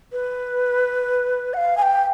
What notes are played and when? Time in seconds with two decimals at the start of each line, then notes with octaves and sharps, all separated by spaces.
0.12 B4
1.54 F#5
1.57 F5
1.77 G#5
1.82 G5